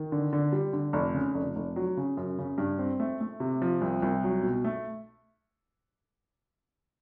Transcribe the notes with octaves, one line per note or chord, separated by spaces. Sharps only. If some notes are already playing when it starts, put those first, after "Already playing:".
Already playing: D#3
D3
D3
G3
D3
F1
C#3
F1
F1
F#3
C#3
F#2
C#3
G2
C4
A3
A3
C3
F3
C2
C2
F#3
B2
A3